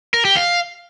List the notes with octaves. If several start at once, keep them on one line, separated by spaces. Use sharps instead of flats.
A#4
G4
F5